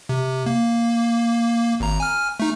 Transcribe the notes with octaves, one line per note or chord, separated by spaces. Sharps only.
C3
A#3
G#1 A#5
G#5 F6
A3 D#4